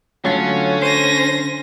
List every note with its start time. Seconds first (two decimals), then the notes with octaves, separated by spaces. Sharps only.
0.25 D3 F#3 A3 C#4 F4
0.82 C5 A#6 D#7